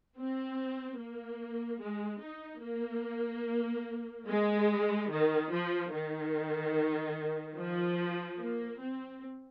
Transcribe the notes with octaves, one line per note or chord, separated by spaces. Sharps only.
C4
A#3
G#3
D#4
A#3
G#3
D#3
F3
D#3
F3
A#3
C4